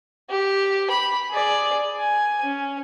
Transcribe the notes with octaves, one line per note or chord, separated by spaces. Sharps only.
G4
B5
G#4 D5
G#5
C#4